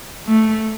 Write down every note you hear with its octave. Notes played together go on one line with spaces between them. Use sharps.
A3